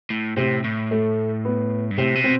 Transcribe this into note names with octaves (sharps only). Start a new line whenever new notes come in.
A2
A2 C3 C4
A2
A3
B3
G2
A2 C3 C4
B2
C4